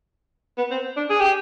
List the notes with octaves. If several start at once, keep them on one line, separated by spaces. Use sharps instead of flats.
B3
C4
D4
G#4
G4